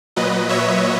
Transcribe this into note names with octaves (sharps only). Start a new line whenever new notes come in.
A#2 F#3 B4 D#5
C#5 E5